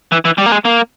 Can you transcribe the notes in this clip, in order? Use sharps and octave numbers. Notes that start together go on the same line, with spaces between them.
E3
E3
G3
A#3
G#3
A#3